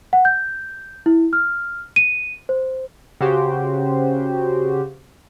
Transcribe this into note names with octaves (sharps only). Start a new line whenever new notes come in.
F#5
G6
E4
F6
D#7
C5
C#3 F#4 G4 C5